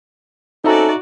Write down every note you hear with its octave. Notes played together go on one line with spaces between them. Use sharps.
C4 C#4 D#4 F#4 A4 D5 E5 A#5